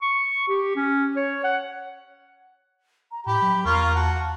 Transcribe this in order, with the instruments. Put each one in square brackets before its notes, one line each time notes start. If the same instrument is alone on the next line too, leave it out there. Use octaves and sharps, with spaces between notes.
[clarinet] C#6
G4
C#4
C#5
F#5
[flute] A#5
[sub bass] A2 [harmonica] G4 [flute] B5
[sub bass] F#3
[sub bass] E2 [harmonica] A#3 F4 A#4 [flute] C#6
[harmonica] F#4 [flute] A5
[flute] A5